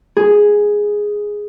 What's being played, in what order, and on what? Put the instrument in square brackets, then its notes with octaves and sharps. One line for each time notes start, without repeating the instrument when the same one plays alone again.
[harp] G#4